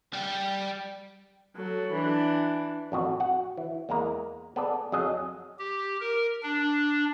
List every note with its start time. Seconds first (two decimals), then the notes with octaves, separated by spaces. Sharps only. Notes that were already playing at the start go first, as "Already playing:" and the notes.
0.13 G3 G5
1.56 F#3 A4
1.93 E3 D4
2.92 A1 F2 F#4
3.20 F#4 F#5
3.57 E3
3.89 E2 G#3 A#3 A#5
4.56 B3 G#4 A4 D5
4.92 F2 F#3 G#4 D#5
5.59 G4
6.01 A#4
6.43 D4